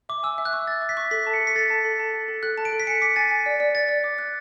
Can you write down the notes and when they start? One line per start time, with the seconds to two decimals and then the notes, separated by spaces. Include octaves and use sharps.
0.09 E5 D6
0.23 G#5 E6
0.38 E5
0.45 F#6
0.53 C#6
0.67 E5 A6
0.82 E5
0.89 B6
0.97 C#6
1.11 A4 B6
1.27 A5
1.34 C#7
1.40 A4
1.47 B6
1.55 A4 A6
1.70 A5
1.84 A4
1.99 A5
2.14 A4
2.28 A4
2.43 A4 F#6
2.58 A5
2.65 D7
2.72 A4
2.80 B6
2.87 G#5 C#7
3.02 D6 B6
3.16 G#5 A6
3.31 G#5
3.46 D5
3.60 D5
3.75 D5 A6
3.89 D5
4.04 D6
4.18 F#6